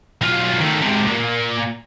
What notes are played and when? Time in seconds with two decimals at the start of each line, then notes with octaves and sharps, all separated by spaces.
0.21 B1 F4
0.59 D#3 A3
0.82 G#2 C3
1.07 A#2